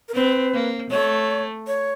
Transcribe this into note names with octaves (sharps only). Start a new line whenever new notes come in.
A#4
C4 B4
A#3
A3 C#5
C#5